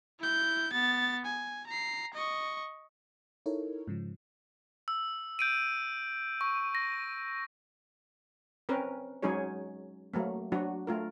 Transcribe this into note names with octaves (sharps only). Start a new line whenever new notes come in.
E4 G6
B3 A6
G#5
A#5 C7
D#5 C#6
D#4 E4 A4 A#4 C#5
G#2 C#3 F3
E6
G6 D7 D#7
C#6
A#6
C4 C#4 A#4 B4
F#3 G#3 C#4 D#4 G#4 C#5
F#3 A3 A#3
F#3 D4 F#4
A3 F4 A#4